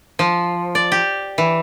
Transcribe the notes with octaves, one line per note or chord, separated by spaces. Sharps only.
F3
D5
G4
E3